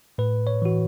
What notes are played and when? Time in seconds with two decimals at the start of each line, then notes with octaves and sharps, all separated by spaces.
0.18 A2 B4
0.47 C#5
0.62 E3 F#4